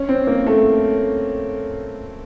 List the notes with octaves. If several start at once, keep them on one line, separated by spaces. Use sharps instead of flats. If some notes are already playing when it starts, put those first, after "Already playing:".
Already playing: C#4
C4
A#3
A3